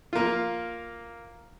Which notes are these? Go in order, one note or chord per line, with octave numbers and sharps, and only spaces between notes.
A#3 F4